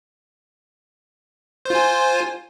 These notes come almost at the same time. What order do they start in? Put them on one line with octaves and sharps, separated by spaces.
C5 F4 G#5